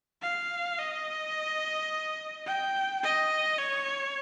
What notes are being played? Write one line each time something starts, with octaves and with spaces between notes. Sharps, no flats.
F5
D#5
G5
D#5
C#5